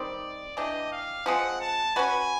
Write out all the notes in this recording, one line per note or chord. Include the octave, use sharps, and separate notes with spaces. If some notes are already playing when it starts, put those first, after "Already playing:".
Already playing: D#3 G3 C4 D5
E3 A3 D4 G4 D#5
F5
F3 G#3 C4 F#5
A5
C#4 F#4 B4 G#5